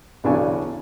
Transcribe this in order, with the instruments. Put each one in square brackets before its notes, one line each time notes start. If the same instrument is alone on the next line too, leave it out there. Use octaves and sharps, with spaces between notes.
[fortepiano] B1 C#3 E3 D4 G#5 C#6